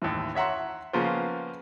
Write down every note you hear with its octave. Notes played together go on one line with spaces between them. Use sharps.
A1 D#2 A2 E3
C#5 E5 F#5 A#5 C6
C#3 F3 A#3 B3 F4 C5